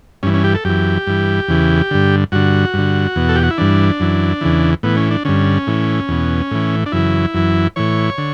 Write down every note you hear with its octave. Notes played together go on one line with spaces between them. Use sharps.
G2 E3 C#4
C#4
G4
A4
F#2 E3 G4
G2 E3
E2 C#3 E3
G2 D3
G2 D3 F#4
G2 D3
E2 B2
A4
G4
F#4
E4
G2 E3 D4
F#2 E3
E2 C#3 E3
A2 E3 B3
C#4
D4
G2 D3 C#4
A2 E3
E2 B2
A2 E3
D4
F#2 C#3 E3 E4
F#2 E3
A2 E3 C#5
D3